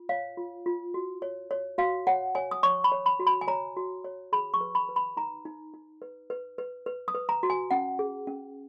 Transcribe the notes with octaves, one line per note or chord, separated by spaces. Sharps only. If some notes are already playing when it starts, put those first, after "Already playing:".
Already playing: F4
C#5 F5
F4
F4
F#4
C#5
C#5
F#4 F5
C#5 F#5
C#5 G#5
D#6
C#5 C#6
B5
C#5
B5
F#4
B5
G#5
C#5 A#5
F#4
C#5
G#4 B5
C#6
B4
B5
B4
B5
D#4 A#5
D#4
D#4
B4
B4
B4
B4
D#6
B4
A#5
F#4
G#5
C#4 F#5
G#4
C#4